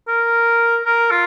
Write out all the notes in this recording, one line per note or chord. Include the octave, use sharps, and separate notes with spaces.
A#4
A#4
F4